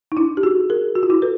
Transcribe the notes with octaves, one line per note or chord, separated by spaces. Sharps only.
D#4
D4 E4
G4
F#4 G#4
G#4 A#4
F#4
F4
E4 F#4
A4 B4